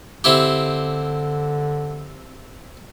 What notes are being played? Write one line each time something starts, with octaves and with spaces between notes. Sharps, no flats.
D3 C4 E4 G4